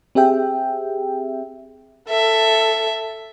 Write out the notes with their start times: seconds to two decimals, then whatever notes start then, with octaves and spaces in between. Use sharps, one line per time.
0.15 C4 G4 G#4 E5 G5
2.09 A4 E5